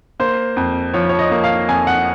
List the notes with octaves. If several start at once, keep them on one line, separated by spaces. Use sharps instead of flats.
A#3 C5
F2
F3 C#5
C#5
D#5
A#3
F5
F2 G#5
F#5